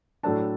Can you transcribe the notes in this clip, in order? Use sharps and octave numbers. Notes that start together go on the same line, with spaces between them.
A2 F#3 A3 D4 A5